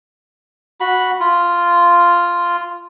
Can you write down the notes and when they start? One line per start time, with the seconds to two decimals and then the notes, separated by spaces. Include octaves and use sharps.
0.80 F#4 B5
1.20 F4